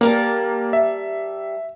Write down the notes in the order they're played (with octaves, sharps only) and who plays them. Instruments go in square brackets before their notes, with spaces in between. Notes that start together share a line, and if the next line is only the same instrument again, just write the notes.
[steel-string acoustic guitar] G3 A#4 A5 [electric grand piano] A#3
[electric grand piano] E5